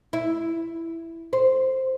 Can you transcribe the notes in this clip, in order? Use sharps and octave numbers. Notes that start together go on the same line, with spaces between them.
E4
C5